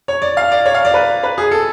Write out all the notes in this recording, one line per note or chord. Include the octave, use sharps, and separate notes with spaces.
C#5
D5
F5
D5
C#5
F5
D5
B4
B4
G#4
A4